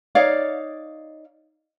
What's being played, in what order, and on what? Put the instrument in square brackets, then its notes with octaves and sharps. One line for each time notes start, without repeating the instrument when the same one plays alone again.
[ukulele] D#4 C#5 D5 F5